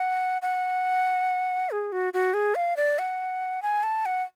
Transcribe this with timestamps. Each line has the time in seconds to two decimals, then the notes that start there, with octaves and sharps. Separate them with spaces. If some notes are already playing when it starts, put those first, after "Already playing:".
Already playing: F#5
0.42 F#5
1.71 G#4
1.92 F#4
2.14 F#4
2.34 G#4
2.55 F5
2.77 D5
2.99 F#5
3.62 G#5
3.83 A5
4.06 F#5